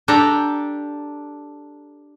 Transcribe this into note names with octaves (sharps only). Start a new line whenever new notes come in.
D4 G4 A4 G5 A#5